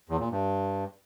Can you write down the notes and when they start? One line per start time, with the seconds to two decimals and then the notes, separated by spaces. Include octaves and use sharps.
0.09 E2
0.20 A#2
0.31 G2